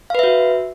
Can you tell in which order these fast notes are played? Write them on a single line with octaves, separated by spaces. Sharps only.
F5 B4 E5 F#4